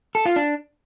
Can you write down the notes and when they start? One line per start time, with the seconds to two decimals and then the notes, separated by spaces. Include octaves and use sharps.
0.15 A4
0.25 F4
0.36 D4